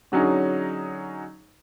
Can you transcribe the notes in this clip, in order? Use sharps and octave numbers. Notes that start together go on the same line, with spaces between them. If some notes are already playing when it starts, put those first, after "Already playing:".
D3 F#3 C#4 D#4 G#4